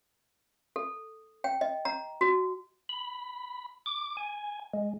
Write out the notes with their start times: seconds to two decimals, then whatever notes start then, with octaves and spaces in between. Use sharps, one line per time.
0.76 A4
1.44 G5
1.61 D#5
1.85 A#5
2.21 F#4
2.89 B5
3.86 D6
4.17 G#5
4.73 G#3